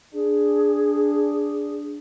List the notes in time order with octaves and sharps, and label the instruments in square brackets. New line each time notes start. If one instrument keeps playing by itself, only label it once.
[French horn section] D4 [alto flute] G#4